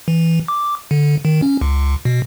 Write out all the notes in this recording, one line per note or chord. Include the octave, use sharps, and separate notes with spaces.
E3
D6
D3
D#3
C#4
C#2
B2